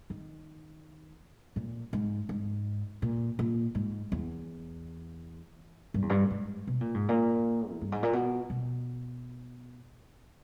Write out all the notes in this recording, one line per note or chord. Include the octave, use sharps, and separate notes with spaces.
D#3
A#2
G#2
G#2
A#2
A#2
G#2
E2
G2
E2
G2
G#2
B2
A#2
G#2
A#2
E2
G2
G#2
A#2
B2
B2